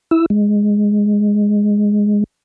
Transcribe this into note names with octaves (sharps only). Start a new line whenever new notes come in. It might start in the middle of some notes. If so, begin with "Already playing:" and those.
E4 E6
G#3